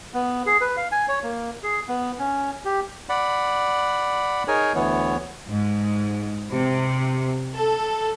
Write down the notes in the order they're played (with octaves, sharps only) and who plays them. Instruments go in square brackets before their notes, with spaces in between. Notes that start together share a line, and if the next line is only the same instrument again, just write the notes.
[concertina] B3
G#4
B4
F5
G#5
C#5
A#3
G#4
B3
C#4
G4
[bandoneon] D5 F#5 B5
D#4 G#4 A#4 C#5 G#5
D2 E3 B3 C#5
[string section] G#2
C3
A4